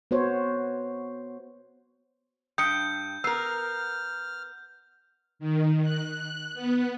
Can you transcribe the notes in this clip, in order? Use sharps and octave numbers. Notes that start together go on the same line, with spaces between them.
B3 F#4 C5 C#5
G2 G5 D#6 G6 C#7
B3 A#4 E6 F6 C7
D#3
F#6
B3